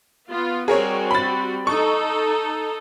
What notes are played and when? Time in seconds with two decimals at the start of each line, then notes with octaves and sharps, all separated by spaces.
0.30 B3 F4
0.68 G3 C4 F#4 G#4 A#4 C#5
1.11 B5 A6
1.67 D#4 A4 C#6